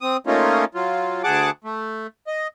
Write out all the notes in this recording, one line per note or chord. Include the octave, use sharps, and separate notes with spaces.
C4 D#6
A3 A#3 C#4 D#4 F4
F#3 F4
D2 G#4 F#5 A5 D6
A3
D#5